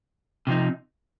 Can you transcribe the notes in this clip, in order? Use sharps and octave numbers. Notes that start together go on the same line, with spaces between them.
C3 F3 D#4